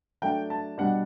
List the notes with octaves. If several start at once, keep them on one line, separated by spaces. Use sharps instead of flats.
F#3 A3 D4 G5
A5
B2 G3 D4 F#5